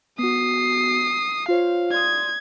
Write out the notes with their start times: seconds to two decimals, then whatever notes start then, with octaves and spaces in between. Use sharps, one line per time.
0.19 B3 F#4 D#6 C7
1.48 F4 C5 C#5 F5
1.92 D5 C6 D#6 G#6